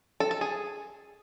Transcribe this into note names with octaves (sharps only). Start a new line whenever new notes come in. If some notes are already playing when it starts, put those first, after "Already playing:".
A4
A4
G#4